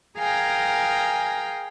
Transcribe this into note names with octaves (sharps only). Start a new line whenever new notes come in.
G#4 A#4 F5 G5 G#5 A#5